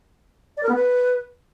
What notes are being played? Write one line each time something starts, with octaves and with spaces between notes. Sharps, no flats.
D5
A#4
B3
B4